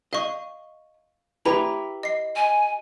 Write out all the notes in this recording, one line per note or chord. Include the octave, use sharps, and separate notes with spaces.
D#5 F5 C#6
E4 G4 B4 A#5 F7
D#5 C7
D#5 G#5